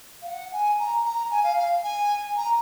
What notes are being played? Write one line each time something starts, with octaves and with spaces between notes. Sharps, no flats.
F5
F#5
G#5
A#5
A#5
G#5
F5
F5
G#5
A#5